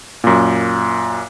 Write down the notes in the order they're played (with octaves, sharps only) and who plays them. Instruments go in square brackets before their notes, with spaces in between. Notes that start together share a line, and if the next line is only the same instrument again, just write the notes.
[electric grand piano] F#2 A#2